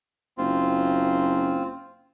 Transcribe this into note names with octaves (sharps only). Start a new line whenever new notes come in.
F#1 C4 F4